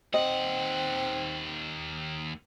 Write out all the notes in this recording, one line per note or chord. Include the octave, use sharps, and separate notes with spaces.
D#2 C4 D#5 F#5